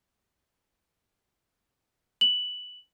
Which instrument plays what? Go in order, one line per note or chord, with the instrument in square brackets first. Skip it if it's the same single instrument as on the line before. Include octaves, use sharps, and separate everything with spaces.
[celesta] F#7